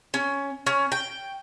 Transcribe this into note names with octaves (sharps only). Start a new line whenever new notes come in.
C#4
C#4
G5